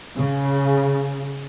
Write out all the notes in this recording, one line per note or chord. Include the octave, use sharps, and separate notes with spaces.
C#3